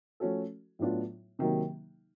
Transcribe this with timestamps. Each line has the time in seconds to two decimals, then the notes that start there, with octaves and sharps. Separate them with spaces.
0.20 F3 A3 C#4 F#4 A4
0.79 A2 F#3 B3 D4 F4
1.39 C3 D#3 F#3 A#3